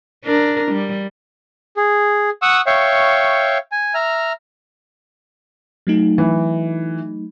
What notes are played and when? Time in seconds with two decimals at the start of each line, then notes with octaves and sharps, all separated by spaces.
0.25 D4 A#4
0.72 G3
1.77 G#4
2.42 F#5 C#6 D#6 E6
2.66 C#5 E5 F5 G5 C#6
3.72 G#5
3.94 E5 A#5 F6
5.87 F#3 A3 D#4
6.18 E3